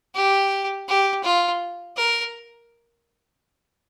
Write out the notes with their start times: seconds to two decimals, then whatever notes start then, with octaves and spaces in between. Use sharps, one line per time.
0.15 G4
0.88 G4
1.24 F4
1.97 A#4